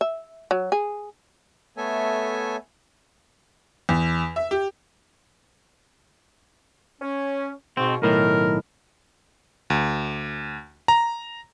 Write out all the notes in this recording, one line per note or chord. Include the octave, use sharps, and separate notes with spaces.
E5
F#3
G#4
A3 B3 A4 C#5 E5 G#5
E2
E5
G4
C#4
G#2 B2 C4
B1 A2 D#3 A#4
D2
A#5